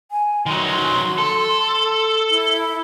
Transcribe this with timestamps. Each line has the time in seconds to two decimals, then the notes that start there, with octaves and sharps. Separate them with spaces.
0.11 G#5
0.46 D#3 F#3 C6
1.18 A4
2.30 E4